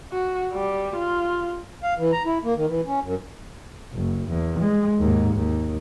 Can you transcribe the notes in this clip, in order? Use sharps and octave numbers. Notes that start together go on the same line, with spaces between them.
F#4
G3
F4
F5
E3
A#5
E4
A#3
D#3
E3
C#4
F#2
F#1
E2
G#3
D#2 G#2
D#2